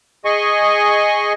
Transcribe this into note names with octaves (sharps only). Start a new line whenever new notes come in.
G#4 D#5 G#5 C#6